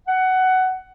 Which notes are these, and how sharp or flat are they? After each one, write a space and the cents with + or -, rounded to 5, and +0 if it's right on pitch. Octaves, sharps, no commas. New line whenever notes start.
F#5 +15